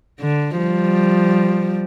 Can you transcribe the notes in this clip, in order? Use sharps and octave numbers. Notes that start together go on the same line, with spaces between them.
D3
F3 G3